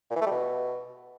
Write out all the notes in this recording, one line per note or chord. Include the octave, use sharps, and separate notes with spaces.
A#2
E3
A3
G3
B2